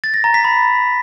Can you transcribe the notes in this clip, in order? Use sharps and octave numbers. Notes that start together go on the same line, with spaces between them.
A6
A#6
A#5
B6
B5